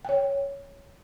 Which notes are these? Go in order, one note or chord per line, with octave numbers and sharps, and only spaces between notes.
C#5 G5